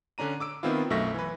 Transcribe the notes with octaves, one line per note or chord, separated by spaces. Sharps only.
D3 C#4 D4 A#5 D#7
D6 E6 D7
D#3 B3 C4 E4 F4
B1 F#2 A3 E5 C#6 A#6
E3 B4